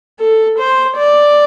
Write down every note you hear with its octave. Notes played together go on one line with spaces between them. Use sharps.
A4
C5
D5